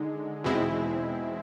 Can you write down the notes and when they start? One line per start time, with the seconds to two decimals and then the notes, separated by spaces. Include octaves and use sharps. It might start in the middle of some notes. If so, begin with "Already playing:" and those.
Already playing: D3 G#3 D#4
0.44 E2 B2 G#3 C4 E4